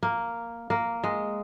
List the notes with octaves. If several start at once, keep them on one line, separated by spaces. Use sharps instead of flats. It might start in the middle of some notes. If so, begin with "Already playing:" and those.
A#3
A#3
G#3